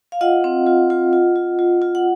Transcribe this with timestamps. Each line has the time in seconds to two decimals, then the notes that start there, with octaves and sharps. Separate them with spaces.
0.12 F5
0.21 F4 D#5 F#5
0.44 C4
0.67 F4
0.90 F4
1.13 F4
1.36 F4
1.59 F4
1.82 F4
1.95 F#5